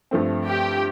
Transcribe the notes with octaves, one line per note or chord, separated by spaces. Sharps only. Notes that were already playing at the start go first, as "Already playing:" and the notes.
G2 F3 A3 C4
G4